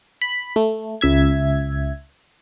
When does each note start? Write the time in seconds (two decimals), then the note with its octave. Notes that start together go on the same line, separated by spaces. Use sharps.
0.22 B5
0.56 A3
1.01 C#2 E5 G#6